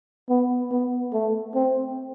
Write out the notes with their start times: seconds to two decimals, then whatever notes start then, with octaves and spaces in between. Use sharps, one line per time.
0.29 B3
0.71 B3
1.13 A3
1.55 C4